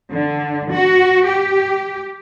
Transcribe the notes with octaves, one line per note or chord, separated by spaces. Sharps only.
D3
F#4
G4